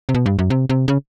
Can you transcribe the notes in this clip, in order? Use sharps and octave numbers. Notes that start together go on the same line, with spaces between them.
C3
B2
G2
F#2
C3
C3
C#3